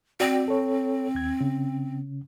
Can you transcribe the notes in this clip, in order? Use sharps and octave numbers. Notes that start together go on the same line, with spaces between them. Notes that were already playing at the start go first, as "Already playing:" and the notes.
C4 F#4 D5 G5
A4 C#5
D#2 G#6
C#3 C#4